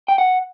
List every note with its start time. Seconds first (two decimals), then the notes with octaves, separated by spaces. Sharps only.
0.08 G5
0.18 F#5